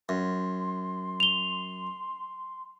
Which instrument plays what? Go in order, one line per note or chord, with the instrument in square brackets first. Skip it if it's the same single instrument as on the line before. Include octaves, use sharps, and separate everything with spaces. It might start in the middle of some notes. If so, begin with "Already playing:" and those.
[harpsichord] F#2 [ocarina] C6
[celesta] F7 G7